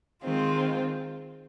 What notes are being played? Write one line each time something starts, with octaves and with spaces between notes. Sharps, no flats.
D#3 G#3 C4 F4